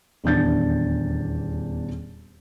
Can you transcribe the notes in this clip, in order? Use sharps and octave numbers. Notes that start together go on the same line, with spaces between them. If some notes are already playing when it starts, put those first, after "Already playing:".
D#1 E2 D4 G6 A6